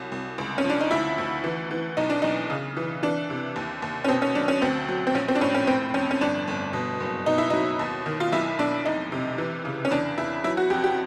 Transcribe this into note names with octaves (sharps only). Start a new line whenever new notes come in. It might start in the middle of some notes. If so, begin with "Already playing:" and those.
Already playing: C2 F#3
C2
C#2
C#4
F3
D4
D#4
D2 E4
D2
E3
E3
B1 D#4
D4
B1 D#4
C#3
E3
E3 D4
C3
D#2
D#2
C#4
B2 C4
C#4
F#3 D4
C#4
D2 C4
F#3
C4
A#1 C#4
C4
D4
A2 C#4
C#4
F1 C4
F2 C#4
C#4
G1 D4
G1
B2
F#1
B2 D#4
E4
F#3 D#4
D#2
D#3
F4
B1 E4
B1 D4
F1 D#4
C3
E3
C#3
C#4
E2 D4
E2 E4
F#3 E4
F#4
F2 G4
G4